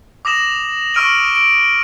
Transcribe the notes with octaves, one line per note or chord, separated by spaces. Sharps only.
D6 D#6 A#6 E7 F#7
C#6 E6 F6 D7 D#7 F#7
D7